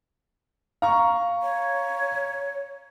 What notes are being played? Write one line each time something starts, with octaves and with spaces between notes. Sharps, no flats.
F5 A#5 C#6
C#5